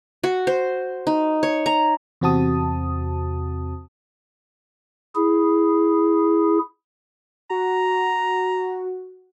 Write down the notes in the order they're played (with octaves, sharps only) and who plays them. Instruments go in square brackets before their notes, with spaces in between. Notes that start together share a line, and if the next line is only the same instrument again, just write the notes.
[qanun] F#4
C5
D#4
C#5
A#5
[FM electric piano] E2 C3 C4 F#4 A5 D#6
[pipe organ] E4 G#4
[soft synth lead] F#4 [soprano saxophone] A#5